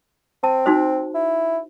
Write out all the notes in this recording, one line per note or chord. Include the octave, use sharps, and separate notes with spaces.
C4 A5
D#4 F#4 C5
E4